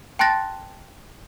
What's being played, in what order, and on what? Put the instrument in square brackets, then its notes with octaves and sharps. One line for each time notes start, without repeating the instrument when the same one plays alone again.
[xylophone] G5 A5 C6 F#6 A6 A#6